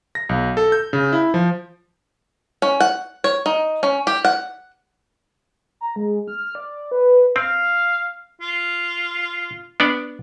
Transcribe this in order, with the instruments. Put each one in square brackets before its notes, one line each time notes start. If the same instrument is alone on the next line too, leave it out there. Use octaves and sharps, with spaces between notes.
[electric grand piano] A#6
B1
A4
G6
C#3
E4
F3
[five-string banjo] C#4
F#5
C#5
D#4
C#4
G4
F#5
[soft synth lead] A#5
G#3
F6
D5
B4
[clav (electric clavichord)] C4 [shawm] F5
[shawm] F4
[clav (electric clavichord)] B3 D4 D5